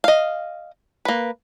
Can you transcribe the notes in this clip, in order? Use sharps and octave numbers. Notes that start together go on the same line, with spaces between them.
D#5 F5
A#3 B4